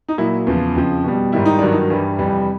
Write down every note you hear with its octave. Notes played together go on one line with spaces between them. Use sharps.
D#4
A#2 F#3 E4
E2 C#3 F3
F2 C#3 F3
B2 G3
G#2 D#3 G3 E4
D#4
G2 D#3 F#3 D4
D#4
G2 E3 G3
F2 C3 E3 G3